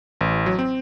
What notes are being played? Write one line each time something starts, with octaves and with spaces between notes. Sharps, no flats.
A1
F#3
C4